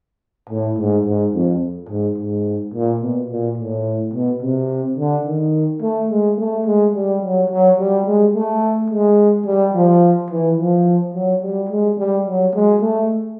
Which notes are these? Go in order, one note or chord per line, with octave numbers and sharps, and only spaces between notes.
A2
G#2
G#2
F2
G#2
G#2
A#2
B2
A#2
A2
B2
C3
D3
D#3
A3
G#3
A3
G#3
G3
F#3
F#3
G3
G#3
A3
G#3
G3
F3
E3
F3
F#3
G3
G#3
G3
F#3
G#3
A3